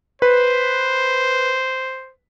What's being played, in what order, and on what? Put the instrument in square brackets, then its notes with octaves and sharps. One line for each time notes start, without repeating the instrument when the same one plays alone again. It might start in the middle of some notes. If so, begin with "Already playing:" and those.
[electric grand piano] B4 [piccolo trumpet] C5